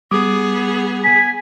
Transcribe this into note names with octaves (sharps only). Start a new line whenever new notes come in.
G3 B3 G#4 D6 D#6
G#5 B6